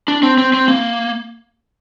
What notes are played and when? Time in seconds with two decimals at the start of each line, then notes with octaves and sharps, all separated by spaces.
0.08 D4
0.23 C4
0.38 C4
0.54 C4
0.68 A#3